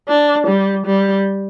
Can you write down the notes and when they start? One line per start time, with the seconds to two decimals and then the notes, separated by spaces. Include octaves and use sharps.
0.08 D4
0.47 G3
0.86 G3